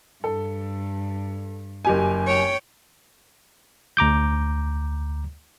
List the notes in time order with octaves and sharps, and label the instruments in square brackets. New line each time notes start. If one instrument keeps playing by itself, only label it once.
[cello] G2 [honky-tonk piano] A4
[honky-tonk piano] F#1 G4 G#5
[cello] C#5 G5
[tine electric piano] D2 A#5 D6 G6